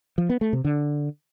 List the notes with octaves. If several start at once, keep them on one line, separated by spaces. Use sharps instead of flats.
F3
B3
A3
C3
D3